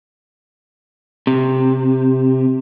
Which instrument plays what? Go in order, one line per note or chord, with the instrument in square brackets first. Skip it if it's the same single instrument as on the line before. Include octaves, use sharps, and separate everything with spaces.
[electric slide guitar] C3